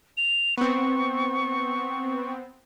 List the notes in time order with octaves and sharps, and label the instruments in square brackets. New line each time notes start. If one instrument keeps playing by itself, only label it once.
[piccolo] F7
[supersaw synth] B3 C4 [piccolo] C#6